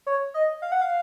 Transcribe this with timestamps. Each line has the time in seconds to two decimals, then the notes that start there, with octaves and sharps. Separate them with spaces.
0.07 C#5
0.34 D#5
0.62 F5
0.72 F#5
0.82 F5